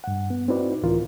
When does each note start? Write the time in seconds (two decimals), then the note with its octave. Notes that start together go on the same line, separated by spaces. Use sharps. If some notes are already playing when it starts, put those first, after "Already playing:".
0.04 G2 F#5
0.30 B3
0.48 C4 D#4 E4 F#4 B4 D5
0.83 C#2 A2 E3 F4 A#4